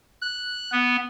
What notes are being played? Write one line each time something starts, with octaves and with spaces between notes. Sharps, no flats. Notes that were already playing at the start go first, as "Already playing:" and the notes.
F#6
B3